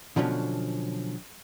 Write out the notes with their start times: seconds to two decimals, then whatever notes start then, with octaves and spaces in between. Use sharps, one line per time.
0.16 B2 D3 F3 F#3 C#4